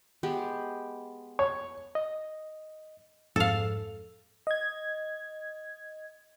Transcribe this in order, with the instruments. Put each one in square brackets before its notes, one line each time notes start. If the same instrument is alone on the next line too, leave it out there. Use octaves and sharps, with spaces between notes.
[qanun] G#3 B3 G4
[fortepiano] C#5
[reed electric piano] D#5
[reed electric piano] F2 G#2 E6 [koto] A4 F5
[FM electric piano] D#5 G#6